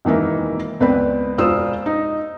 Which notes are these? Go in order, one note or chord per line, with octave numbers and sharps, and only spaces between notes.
E1 D#3 E3 A#3 E5
C#2 B3 C4 B4 D5 B5
E1 F4 C5 D5 D#6 E6
D#4